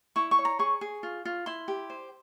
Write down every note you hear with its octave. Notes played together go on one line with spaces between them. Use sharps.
E4 C#6
C#6
C#5
A#5
G#4 C#6
G#4
F4
F4
E4 C6
G4
C5